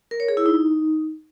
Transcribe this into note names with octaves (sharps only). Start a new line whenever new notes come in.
A#4
C#5
G#4
E4
D#4